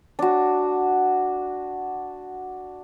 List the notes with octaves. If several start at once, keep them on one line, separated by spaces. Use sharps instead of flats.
D4 F#4